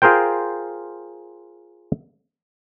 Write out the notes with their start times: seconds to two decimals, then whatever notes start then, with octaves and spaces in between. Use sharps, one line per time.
0.02 F4 G#4 A#4 C5 G5